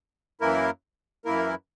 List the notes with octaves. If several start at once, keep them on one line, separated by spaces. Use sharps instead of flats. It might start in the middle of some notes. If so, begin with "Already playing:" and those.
F#2 E3 A#3 E4 A#4
F#2 E3 A#3 E4 A#4